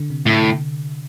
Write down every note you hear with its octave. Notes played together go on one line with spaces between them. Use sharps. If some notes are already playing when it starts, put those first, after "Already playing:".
Already playing: D3
C3
A2 C3
D3